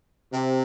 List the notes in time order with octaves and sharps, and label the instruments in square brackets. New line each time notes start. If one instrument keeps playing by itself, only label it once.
[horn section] C3